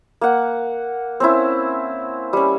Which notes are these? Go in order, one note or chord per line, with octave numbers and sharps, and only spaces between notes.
A#3 F#5
C4 C#4 E4
G3 C#4